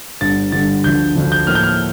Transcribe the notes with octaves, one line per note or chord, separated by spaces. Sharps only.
G1 G2 D3 A6
G1 G2 D3 A6
D2 D3 F3 G6
D2 D3 F3
G6
A2 F3 A#3 E4 F6
G6
F6